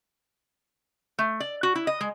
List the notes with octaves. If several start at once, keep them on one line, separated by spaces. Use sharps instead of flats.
A3
D5
F#4
E4
D#5
G#3